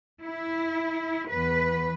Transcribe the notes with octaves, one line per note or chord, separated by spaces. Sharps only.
E4
E2 B4